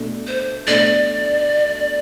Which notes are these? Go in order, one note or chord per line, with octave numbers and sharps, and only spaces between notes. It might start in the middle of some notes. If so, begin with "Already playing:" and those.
Already playing: B2 A3 D4
C5
B2 A3 D4 D5